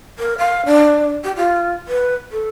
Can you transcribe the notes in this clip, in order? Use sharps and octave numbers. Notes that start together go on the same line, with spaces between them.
A#4
F5
D4
G4
F4
B4
A4